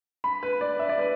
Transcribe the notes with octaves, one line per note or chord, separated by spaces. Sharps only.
B5
B4
D5
E5
D5
B4